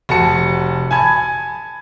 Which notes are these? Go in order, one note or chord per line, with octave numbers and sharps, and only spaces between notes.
F1 F#4 A5 C#7
G#5 A5 B5 G#6